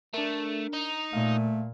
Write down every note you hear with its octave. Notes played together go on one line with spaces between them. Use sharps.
A3 D4 A#4
D#4
A#2 A3 F5